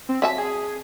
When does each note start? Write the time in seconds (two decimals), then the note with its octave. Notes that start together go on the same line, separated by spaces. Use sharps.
0.09 C4
0.22 F#3 E5 A5 B6
0.38 G#4